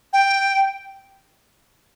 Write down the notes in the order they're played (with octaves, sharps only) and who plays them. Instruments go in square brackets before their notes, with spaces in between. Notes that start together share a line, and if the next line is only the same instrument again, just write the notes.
[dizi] G5